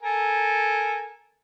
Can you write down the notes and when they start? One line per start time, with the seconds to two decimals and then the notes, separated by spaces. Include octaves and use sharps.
0.03 A4 A#4 G#5